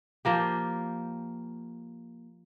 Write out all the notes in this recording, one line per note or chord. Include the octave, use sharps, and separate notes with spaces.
F3 A#3 G4